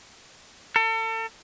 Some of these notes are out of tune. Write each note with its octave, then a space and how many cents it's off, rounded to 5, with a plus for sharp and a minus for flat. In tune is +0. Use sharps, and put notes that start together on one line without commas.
A4 +35